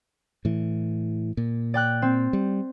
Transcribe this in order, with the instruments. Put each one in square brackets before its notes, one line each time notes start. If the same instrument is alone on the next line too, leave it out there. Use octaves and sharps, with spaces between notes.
[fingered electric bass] A2 E3
A#2
[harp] D5 G5 F#6
C4
[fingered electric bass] G3